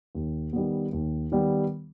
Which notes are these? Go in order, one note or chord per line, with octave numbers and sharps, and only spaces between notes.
D#2
D#3 G3 B3
D#2
D#3 G3 B3